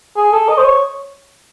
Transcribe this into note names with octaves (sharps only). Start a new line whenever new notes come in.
G#4
A4
D#5
C5
C#5